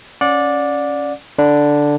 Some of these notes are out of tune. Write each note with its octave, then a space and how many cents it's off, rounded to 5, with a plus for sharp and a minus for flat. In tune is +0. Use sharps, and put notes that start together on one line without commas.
C#4 +0 D5 +0 F#5 -35
D3 +0 D4 +0 B5 +0